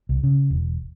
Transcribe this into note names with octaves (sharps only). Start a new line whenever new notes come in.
C2
C#3
E1